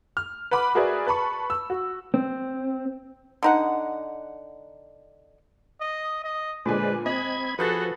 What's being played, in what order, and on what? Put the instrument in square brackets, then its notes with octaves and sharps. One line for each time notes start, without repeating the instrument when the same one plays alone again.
[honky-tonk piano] F6
B4 F#5 B5 D6
F#4 G#4 A#4 B4 D5 E5
B4 A5 B5 C#6
E6
F#4
[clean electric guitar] C4
[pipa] D3 D#4 F#5
[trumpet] D#5
D#5
[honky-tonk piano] A#2 D3 G#5 [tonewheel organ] G#3 C5 D5 [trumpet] B4
[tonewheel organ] C4 G#6 [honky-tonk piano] D#5 [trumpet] B5
[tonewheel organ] F3 [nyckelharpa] F#4 A4 [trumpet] G#4 [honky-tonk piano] B4 F#6 A6